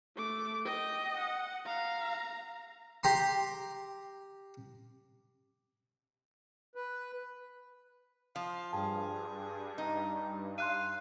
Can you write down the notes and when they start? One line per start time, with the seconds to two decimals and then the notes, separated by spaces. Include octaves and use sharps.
0.16 A3 D6
0.65 D#5 G5
1.17 F#5
1.66 F5 A#5
3.03 G4 A#5 C6
6.75 B4
8.36 F3 F5
8.73 G2 G#4 G5 A5
9.78 D#4
10.58 F5 C6 F#6 D#7